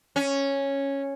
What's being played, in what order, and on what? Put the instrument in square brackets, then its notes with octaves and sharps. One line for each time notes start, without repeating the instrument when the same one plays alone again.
[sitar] C#4